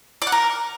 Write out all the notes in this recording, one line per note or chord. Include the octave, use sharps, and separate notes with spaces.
D5
F#5
A#4